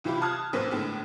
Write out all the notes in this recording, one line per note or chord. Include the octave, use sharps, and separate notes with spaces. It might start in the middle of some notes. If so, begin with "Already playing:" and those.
C2 E3 E4 F4 G4 B5
A5 D#6 F6 F#6 G#6
A1 A#3 B3 C5 B6
A2 D3 G#3 B3